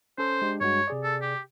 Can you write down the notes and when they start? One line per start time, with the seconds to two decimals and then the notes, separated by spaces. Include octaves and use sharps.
0.18 C#4 A4 C5
0.42 G#3 D4 G4
0.61 G2 G#3 F#4 C#5
0.88 C3 G#4 D5
1.04 A4
1.22 G4